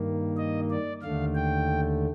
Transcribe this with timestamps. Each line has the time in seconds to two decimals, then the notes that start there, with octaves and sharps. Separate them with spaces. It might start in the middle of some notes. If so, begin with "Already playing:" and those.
Already playing: G2 D#3 A#3
0.37 D#5
0.70 D5
1.02 D#2 D3 A3 F5
1.35 G5